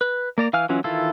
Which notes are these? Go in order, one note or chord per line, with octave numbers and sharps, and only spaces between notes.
B4
A#3 D5 A#5
E3 F5 G#5 F6
E3 F#3 C#4 F4
D#3 E3 E4 F4 A4